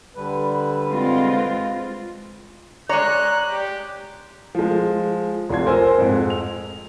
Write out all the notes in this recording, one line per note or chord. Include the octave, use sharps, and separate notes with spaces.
D3 G3 B4
G#3 C4 F4
G#3 C#5 D5 A#5 F#6
G4
F3 G#3
F1 F3 C6 G#6
A#4 C5 G#5 E6
F2 G#2
F7